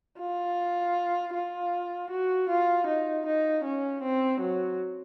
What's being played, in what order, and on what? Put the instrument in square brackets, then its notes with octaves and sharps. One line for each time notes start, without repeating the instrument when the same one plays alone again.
[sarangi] F4
F4
F#4
F4
D#4
D#4
C#4
C4
F#3